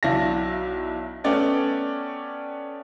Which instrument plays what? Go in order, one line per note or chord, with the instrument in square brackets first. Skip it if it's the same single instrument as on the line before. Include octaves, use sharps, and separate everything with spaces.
[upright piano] B1 D4 E4 F5 A#6
A3 B3 C#4 D5 F#5 G5